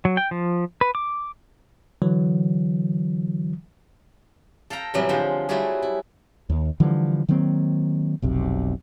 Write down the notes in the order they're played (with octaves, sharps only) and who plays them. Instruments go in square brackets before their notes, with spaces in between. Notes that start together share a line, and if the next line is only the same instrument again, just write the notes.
[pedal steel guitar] F#3
G5
F3
B4
D6
[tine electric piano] D3 E3 F#3
[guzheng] A4 F5 G5 A#5
A2 C3 E3 F#3 G3 A3
D3 F3 G#3 F4 C5
F#3 G3 A3 E4 F#4 G#4
E4
[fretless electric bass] D#2
D3 E3 F3 G3
D#3 F#3 A#3 C4
F1 B1 C3